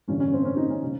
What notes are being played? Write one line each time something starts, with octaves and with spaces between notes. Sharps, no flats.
A1 G2 D3 C#4
C#4
C4
C#4
D#4
C#4
C#3